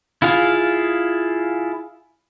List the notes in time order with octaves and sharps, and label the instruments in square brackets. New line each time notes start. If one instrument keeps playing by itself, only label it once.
[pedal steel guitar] E4 F4 G#4 F5